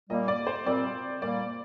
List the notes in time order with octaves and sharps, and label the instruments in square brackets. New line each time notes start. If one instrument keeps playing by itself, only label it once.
[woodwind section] A#2 G3 A#3 [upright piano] D#5
[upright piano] D5
C5
[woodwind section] A#2 G3 C4 [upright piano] D5
[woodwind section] A#2 G3 A#3 [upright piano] D5